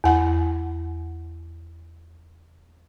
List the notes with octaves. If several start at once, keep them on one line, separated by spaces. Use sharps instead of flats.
E2 F#5